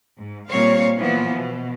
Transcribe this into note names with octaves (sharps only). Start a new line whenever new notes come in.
G#2
A#2 G3 C4 C#5 F5
A#2 E3 F3 B3
B2